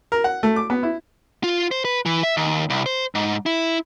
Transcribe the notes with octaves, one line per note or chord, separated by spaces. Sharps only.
A#4
F#5
A3
D6
B3
E4
F4
C5
B4
E3
E5
D#2
C2
C5
G#2
E4